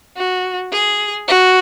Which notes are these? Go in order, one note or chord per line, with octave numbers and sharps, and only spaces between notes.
F#4
G#4
F#4